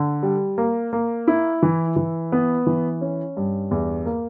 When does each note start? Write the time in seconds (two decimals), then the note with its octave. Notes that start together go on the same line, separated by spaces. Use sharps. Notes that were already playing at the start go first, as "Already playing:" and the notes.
Already playing: D3
0.23 G3
0.58 A#3
0.93 A#3
1.28 E4
1.63 E3
1.96 E3
2.32 B3
2.67 E3
3.01 C#4
3.37 G2
3.71 E2
4.06 A#3